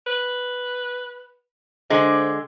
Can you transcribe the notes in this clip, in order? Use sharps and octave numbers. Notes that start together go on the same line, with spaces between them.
B4
D3 F3 G#3